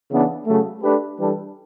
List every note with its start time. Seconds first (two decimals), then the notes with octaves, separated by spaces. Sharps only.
0.10 C#3 E3 B3 D4
0.46 C#3 F#3 A3
0.82 A3 D4 G4 B4
1.17 E3 G3 D4 A4